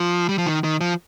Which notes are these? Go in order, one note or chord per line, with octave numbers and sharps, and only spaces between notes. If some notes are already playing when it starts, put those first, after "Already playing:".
Already playing: F3
G3
F3
D#3
D#3
F3